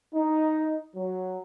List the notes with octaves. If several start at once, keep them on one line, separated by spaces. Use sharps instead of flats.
D#4
F#3